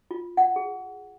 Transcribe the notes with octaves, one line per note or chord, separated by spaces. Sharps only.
F4
F#5
G#4